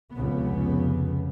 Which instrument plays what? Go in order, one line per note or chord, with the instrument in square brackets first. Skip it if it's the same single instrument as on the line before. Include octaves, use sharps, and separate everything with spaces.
[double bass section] F1 C#2 C#3 B3